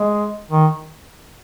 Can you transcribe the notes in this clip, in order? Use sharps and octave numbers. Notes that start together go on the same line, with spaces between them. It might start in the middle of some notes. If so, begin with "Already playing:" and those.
Already playing: G#3
D#3